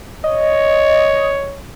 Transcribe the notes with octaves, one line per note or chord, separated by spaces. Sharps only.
C#5 D#5